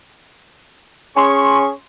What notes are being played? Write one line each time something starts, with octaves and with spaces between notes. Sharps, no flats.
C#4 G#4 G#5 C6 C#6